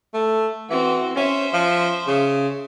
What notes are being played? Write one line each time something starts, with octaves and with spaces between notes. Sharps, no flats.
A3
E3 C4 F#4
C#4 C5 E5
F3
C#3